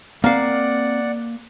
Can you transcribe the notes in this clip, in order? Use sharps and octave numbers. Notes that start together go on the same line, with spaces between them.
A#3 C4 D5 F5 F#5